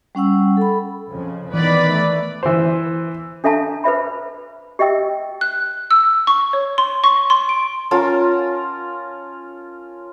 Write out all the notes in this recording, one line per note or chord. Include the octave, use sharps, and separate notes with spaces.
G3 C#4 F#5 E6
A4 B5
F2 C#3 F3
D#3 E3 B3 B4 D5 B5
A3
E3 C5
D4 A4 E5 F5 A5 A#5
B4 C5 E5 B5
G4 D#5 E5 G5 E6
F#6
E6
C#6
C#5
C6
C#6
C6
D7
C#4 F4 A#4 A5